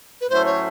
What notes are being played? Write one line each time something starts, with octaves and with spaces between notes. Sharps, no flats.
B4
A2 F#3 A3 C#4 C5
C#5